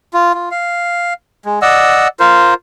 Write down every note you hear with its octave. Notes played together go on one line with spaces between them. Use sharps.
F4
F4
F5
G#3
D5 D#5 F#5 E6
F4 A#4 C5